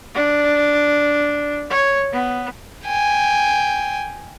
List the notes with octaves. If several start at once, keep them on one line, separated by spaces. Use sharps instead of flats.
D4
C#5
B3
G5 G#5